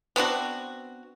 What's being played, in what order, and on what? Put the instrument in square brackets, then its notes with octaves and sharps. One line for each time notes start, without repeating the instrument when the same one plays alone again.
[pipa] B3 C4 D4 F#4